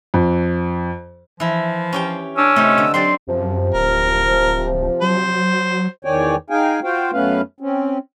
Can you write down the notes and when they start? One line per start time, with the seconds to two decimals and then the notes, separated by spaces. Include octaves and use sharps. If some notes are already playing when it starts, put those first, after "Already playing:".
0.14 F2
1.40 E3 F3 E4
1.93 C#4 G4 G5
2.37 C#4 D4 E6
2.56 C3 A3 D#4
2.78 D3
2.94 F#3 C4 G4 D5 C6
3.28 F#2 C3 F3
3.74 D1 A#4
5.02 F#3 C5
6.05 E2 D#3 C#5 D5 G5 G#5
6.50 D#4 G#4 F5 G5 G#5
6.84 F4 F#4 C5 F5 G5
7.13 F#2 A3 B3 C#4 B4 F5
7.60 C4 C#4